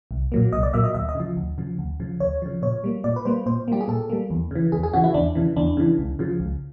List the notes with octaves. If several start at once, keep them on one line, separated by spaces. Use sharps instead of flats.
C2
A#2 F#3 A#3
C2 D#5
D5
A#2 F#3 A#3 E5
D#5
D2 E5
D#5
C#3 F3
D2
C#3 F3
D2
C#3 F3
D2 C#5
C#3 F3
A#2 C#5
G3 A#3
A#2 D5
B4
G3 A#3 C5
A#2 C5
G3 A#3 G4
G#4
A#2 A4
G3 A#3
E2
C#3 E3
E2 G#4
G#4
C#3 E3 F#4
E4
E2 D4
C#3 E3
E2 D4
C#3 E3
C#2
C#3 F3
C#2